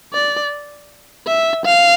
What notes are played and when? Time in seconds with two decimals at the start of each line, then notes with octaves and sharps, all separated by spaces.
0.14 D5
1.27 E5
1.65 F5